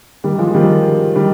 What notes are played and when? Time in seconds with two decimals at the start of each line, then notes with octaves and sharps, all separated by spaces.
0.24 D#3 G3
0.38 F3 G#3
0.54 D#3 G3
1.16 D#3 G3